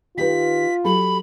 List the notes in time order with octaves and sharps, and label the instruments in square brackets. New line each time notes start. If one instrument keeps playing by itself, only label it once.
[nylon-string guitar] D#3 G4 B4 [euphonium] F4 [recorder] B6
[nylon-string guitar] F#3 G4 A4 [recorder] B5